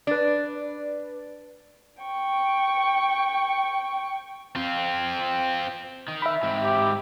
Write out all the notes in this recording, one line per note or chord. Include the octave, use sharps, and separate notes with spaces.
D4 B4 D5
G5 C#6
C4 F4
D#3
E5 B5
G#2 C4
G4